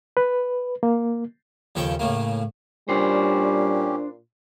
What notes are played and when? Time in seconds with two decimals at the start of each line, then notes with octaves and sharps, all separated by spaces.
0.17 B4
0.83 A#3
1.75 D#2 C#3 F3 A4 G5 C#6
1.99 A2 C#3 A3 A#3
2.89 A#2 G3 C#4 D4 G4 C5